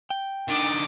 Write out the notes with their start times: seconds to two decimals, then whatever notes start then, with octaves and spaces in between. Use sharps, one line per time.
0.10 G5
0.48 D#3 D4 D6 D#6